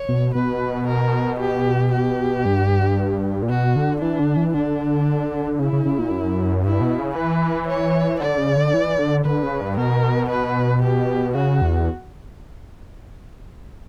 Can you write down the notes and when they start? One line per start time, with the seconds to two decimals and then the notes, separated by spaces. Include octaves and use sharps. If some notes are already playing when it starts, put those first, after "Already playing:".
Already playing: C#5
0.09 B2
0.35 B2 B4
0.88 A#4
1.41 G4
1.93 G4
2.45 G2
3.43 A#2
3.49 B2 F#4
3.76 D3
4.02 E3 D4
4.19 D3
4.37 E3
4.54 D3 D4
5.59 C#3 E4
5.73 C#3
5.85 C#3
5.99 A#2
6.11 F#2
6.64 G2 E4
6.81 B2
6.99 C#3
7.16 E3 B4
7.69 C#5
8.20 D3 D5
8.38 C#3
8.56 D3
8.74 E3
8.99 D3
9.25 D3 B4
9.43 C#3
9.61 G2
9.77 B2 A#4
10.31 B4
10.83 G4
11.35 C#3 F#4
11.62 E2